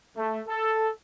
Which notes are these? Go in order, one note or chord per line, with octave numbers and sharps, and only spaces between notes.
A3
A4